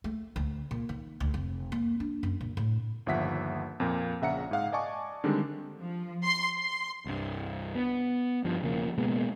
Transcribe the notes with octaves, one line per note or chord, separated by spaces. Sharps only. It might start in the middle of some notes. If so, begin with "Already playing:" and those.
A3
D2
A#2
D#3
D2
F1
A#3
D4
F#2
A#2
A2
G1 D#2 F3 E5 F#5 B6
F2 A#2 A#3
A#1 C#3 E5 F#5 A#5 C#7
G#2 G#4 F5 F#5
D5 D#5 G#5 A5 C#6 D6
D3 D#3 G3 G#3 C4 D4
F3
C6
C6
C2 G2
B3
G2 F3
E1 C#3 F3 A#3
B2 G#3 A#3 B3